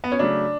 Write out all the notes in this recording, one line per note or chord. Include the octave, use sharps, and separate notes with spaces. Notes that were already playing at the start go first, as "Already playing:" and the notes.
B3
C#4
C#3 F#3 A3 D4